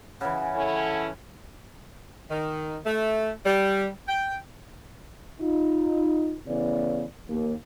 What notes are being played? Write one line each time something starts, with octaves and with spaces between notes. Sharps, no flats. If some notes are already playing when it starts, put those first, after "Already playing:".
C#3 E3 F#5
C#4 E4 A4
D#3
A3
G3
G5
D#4 F4
A2 C#3 E3 B3 B4 D5
D#2 A#3